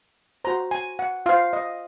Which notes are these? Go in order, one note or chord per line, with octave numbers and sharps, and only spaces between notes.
F#4 C5 A#5
G#5
F#5
F4 C5 F5
D#5